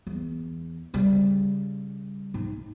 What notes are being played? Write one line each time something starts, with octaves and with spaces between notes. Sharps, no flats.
E2
C#3 G3
G#2